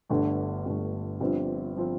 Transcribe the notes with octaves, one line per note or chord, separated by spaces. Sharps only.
G1 G2 D3 A3
G1 G2 D3 A3
G1 G2 F3 C4 F4
F3 C4 F4